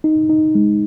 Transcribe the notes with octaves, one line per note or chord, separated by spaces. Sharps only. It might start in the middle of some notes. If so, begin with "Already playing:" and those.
D#4
D#4
G#3